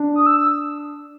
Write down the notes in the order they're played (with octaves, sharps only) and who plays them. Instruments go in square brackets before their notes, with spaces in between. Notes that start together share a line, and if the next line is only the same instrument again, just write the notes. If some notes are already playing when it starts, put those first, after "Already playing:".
Already playing: [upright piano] D4
[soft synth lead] D#6
E6